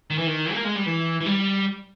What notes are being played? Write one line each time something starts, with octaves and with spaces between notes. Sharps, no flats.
D#3
E3
D#3
A#3
G#3
G3
E3
E3
G3